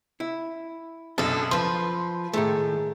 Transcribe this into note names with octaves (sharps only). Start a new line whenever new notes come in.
E4
B1 F#2 D4 A4 D#5
F3 B4 C6
A2 D#3 G#3 A3